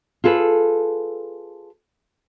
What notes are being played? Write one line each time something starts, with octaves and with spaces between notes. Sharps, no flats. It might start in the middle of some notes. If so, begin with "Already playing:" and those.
F4 G#4 A4 B4